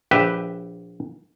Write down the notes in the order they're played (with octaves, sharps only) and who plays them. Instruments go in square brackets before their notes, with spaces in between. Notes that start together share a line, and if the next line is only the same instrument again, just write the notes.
[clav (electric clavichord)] A#1 G4 B4 E5 G5